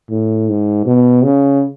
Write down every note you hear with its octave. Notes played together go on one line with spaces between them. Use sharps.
A2
G#2
B2
C#3